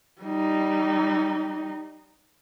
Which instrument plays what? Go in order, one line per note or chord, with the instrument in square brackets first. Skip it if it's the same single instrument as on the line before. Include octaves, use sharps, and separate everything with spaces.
[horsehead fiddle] G3 D#4